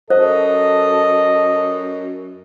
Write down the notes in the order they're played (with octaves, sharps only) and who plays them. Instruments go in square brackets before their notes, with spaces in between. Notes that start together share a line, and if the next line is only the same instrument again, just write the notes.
[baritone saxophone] F#2 [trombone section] A4 [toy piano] C5 [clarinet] D#5